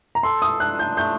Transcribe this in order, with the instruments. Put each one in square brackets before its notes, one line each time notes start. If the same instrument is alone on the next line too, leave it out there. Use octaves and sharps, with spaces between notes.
[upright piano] A#5
[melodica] A4 [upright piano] C6
[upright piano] D#6
[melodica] D4 [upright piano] F#6
[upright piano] G6
[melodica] A3 [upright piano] G6